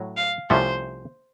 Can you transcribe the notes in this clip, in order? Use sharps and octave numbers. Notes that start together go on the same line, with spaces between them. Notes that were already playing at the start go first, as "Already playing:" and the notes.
Already playing: A2 F#3
F5
C2 C3 F3 A3 C#4 C5